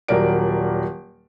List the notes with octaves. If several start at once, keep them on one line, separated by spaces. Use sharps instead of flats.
D#1 F#3 A#4 D5 D7